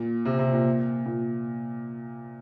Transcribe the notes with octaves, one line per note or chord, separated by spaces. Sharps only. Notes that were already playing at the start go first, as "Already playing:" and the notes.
Already playing: A#2
C3
C3
A#2
A#2